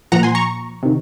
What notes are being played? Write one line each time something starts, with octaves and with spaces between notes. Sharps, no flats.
A#2 F3 F#5 A#5
G#5 C6
A#5 C#6
C3 D#3